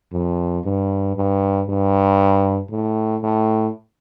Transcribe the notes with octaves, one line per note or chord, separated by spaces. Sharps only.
F2
G2
G2
G2
A2
A2